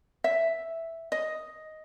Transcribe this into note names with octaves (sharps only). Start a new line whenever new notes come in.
E5
D#5